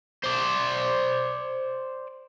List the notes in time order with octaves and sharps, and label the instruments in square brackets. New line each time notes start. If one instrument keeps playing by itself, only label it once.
[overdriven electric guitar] C5 D5